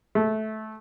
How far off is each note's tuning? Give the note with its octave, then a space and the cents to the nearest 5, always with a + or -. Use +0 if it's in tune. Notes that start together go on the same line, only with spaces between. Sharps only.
A3 -15